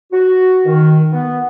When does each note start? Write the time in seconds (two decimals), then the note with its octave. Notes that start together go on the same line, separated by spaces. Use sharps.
0.12 F#4
0.65 D#3
1.12 B3